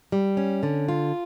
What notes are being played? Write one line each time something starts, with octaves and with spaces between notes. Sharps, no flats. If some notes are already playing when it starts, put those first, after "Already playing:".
G3
C#4
D3
F4